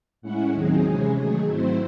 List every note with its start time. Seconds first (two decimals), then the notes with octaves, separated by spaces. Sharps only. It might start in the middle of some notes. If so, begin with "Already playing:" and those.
0.22 A2 G#3 C#4 E4 F#5
0.53 D#2 D#3 F#3 C4 D#4 G#4
0.84 C3 E3 G#3 C#4
1.16 D#3 F#3 A3 G#4
1.47 G#2 F#3 A3 C4 E4 C5